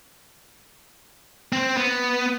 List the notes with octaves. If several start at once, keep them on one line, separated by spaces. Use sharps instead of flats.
C4
B3